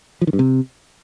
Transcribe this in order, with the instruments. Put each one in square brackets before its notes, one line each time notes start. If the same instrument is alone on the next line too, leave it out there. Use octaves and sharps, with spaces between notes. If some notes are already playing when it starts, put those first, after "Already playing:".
[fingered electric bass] F3
D#3
G2
C3